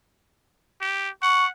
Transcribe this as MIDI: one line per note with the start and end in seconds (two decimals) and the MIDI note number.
0.81 1.09 67
1.23 1.50 78
1.23 1.45 85